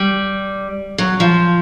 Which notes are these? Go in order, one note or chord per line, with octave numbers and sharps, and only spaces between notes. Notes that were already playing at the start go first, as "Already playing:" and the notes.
Already playing: G3
F#3
F3